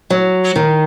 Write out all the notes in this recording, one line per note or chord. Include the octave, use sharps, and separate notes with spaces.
F#3
D#3